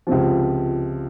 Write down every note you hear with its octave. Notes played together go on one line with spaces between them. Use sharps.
C#2 C3 F3